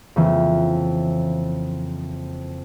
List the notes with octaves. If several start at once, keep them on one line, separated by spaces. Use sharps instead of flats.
F2 C#3 E3 A#3